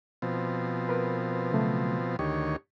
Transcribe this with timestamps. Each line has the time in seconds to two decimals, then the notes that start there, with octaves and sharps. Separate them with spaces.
0.22 B2 F3 C4
0.89 A#4 B4
1.52 C#3 F#3 A3
2.19 D2 D#3 G4 C#5